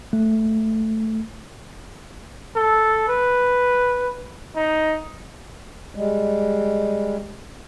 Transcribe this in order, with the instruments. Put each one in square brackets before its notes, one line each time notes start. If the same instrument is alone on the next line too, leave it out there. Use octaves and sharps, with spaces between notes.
[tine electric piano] A3
[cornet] A4
B4
D#4
[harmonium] G3 G#3